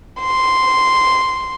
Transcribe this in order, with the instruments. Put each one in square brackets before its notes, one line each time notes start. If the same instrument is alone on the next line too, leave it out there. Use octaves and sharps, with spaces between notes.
[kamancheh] C6